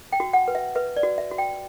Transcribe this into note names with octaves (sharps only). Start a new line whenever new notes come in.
G5
F#4
F#5
B4
E5
B4 E5
D5
F#4
E5
F#4
G5